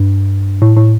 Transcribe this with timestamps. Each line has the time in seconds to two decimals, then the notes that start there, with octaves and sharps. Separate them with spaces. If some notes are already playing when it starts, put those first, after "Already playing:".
Already playing: G2
0.62 A2
0.77 A2